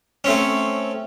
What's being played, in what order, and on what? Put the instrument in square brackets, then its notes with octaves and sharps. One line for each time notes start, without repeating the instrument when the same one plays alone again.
[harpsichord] A3 C4 C#4